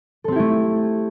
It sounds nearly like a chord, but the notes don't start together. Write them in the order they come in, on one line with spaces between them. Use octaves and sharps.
A4 C4 G4 E4 A3